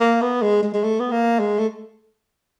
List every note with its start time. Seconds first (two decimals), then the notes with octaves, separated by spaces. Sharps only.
0.01 A#3
0.22 B3
0.42 G#3
0.63 G#3
0.74 G#3
0.84 A3
1.00 B3
1.11 A#3
1.40 G#3
1.59 A3